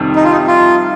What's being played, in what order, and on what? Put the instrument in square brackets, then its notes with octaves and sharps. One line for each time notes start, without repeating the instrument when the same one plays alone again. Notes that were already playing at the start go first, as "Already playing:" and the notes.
Already playing: [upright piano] F2 C3 D#3 G3
[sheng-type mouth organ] D#4
F4
D#4
F4